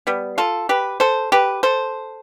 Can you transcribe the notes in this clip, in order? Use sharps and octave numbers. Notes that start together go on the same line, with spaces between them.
G3 B3
F4 A4
G4 B4
A4 C5
G4 B4
A4 C5